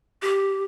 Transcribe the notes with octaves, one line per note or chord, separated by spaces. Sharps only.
G4